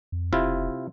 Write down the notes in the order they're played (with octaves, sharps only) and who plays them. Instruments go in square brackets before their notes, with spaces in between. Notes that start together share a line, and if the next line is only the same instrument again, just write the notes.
[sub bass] F2
[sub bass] E1 [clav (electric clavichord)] C3 E4 F4